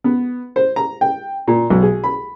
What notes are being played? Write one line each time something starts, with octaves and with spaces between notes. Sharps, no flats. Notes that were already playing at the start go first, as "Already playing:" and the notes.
B3
C5
A#5
G5
A#2
B1
G#4
B5